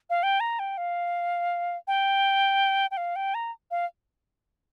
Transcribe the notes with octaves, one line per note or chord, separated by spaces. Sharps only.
F5
G5
A#5
G5
F5
G5
G5
F5
G5
A#5
F5